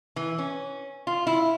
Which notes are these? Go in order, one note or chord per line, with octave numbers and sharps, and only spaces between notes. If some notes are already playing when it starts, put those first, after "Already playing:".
E3
C#4
F4
E4